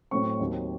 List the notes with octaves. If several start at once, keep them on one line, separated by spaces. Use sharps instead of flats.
A2 F#3 A3 C4 C#6
D#2 D#3 F#3 C4